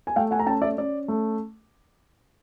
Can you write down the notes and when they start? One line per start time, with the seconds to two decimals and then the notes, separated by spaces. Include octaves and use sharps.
0.07 G#5
0.16 A3 F5 G5
0.31 F#5 G#5
0.39 A#5
0.46 C#4 G5 A5
0.62 D5 E5
0.77 C#4 D5
1.08 A3